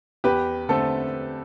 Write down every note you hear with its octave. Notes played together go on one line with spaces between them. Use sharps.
E2 G4 B4
D3 A3 C4 A4